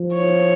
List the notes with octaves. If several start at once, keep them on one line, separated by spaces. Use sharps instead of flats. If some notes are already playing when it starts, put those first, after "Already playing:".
Already playing: F3
C#5